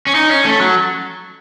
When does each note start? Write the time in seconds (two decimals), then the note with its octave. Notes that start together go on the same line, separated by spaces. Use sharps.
0.07 C#4
0.15 D#4
0.30 C#4
0.45 A3
0.60 F#3